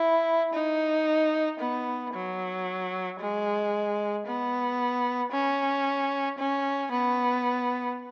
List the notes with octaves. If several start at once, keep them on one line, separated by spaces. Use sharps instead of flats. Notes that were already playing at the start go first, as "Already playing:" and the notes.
Already playing: E4
D#4
B3
F#3
G#3
B3
C#4
C#4
B3